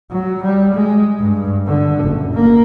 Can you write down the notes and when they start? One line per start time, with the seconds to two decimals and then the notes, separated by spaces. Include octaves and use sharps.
0.11 F#3
0.43 G3
0.74 G#3
1.19 G2
1.67 D3
2.04 F#1
2.33 A#3